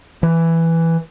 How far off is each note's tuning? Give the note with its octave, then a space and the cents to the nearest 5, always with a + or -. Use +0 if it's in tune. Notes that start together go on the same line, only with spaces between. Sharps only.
E3 +5